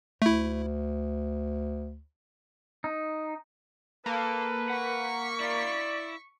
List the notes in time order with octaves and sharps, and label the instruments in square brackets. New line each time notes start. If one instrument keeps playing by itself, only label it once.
[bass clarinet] D2 [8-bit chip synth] A3 E4
[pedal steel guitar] D#4
[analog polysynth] A#3 [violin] A4 [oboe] B4
[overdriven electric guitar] F#5 [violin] C#6 B6
[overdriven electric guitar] E4 F5 [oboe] D5